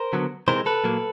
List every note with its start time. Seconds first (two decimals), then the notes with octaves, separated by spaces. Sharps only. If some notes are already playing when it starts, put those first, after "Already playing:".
Already playing: A#4 C5
0.13 D3 F#3 B3
0.48 C3 E3 G#3 A#4 C5
0.66 A4 B4
0.84 A#2 F#3 A#3